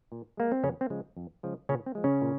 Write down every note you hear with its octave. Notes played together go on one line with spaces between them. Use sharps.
A#2
G#3 A#3
C4
F2 C#3 C#4
C4
C#3 F3 G#3
F2
C#3 F3 G#3
A#2 C#3 C#4
C4
F3 G#3
C#3 C#4
A#2